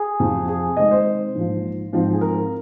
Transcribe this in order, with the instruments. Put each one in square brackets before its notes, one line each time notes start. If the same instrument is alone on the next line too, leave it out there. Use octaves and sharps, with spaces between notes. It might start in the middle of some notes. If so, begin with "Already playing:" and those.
Already playing: [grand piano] G#4
[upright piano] F2 C3 F3
[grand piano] G#4
[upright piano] C3 D#3 G#3 [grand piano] D#5
[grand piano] C5
[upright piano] A#1 G#2 F3
G#2 F3 C4
[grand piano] G#4
A#4